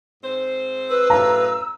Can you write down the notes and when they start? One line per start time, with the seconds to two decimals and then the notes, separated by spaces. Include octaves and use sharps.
0.24 G#2 C4 C5
0.90 B4 E6
1.10 F#2 A2 F5 A#5